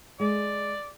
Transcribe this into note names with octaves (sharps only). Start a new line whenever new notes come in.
G#3 D5